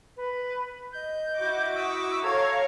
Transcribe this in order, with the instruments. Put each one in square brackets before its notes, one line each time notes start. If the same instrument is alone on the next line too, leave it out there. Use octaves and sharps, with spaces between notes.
[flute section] B4
D#5 G6
[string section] E4 F#4 D6
[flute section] C#6 D#6 E6
[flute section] A4 G#6 [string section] C#5 F5 A#5